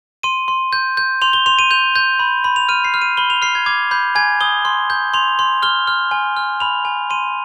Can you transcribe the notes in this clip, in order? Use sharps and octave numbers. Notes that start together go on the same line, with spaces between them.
C6 D#7
C6
G6
G6
C6 F7
G7
C6 F7
D#7
G6 F7
G6
B5
B5
F7
F6 D#7
C7
F6
D#7
B5 G7
F7
F6 C7
G#6
D6 G#6
B5 G6
G#5 G#6
D#6 G7
C6
G6
C6 F7
C6
F6 G7
F6
G#5
F6
B5 F7
G#5
C6 D#7